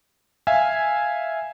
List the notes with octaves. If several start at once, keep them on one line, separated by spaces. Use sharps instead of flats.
E5 F5 G#5